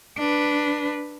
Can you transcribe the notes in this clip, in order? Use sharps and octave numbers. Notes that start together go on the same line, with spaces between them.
D4 B4